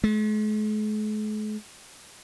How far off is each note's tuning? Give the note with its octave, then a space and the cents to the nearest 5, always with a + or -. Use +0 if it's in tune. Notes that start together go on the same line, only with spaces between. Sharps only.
G#3 +45